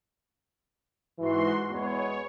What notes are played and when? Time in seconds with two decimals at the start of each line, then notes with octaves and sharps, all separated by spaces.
1.19 G#2 E3 F#4 C6
1.71 E2 G#3 B3 C#5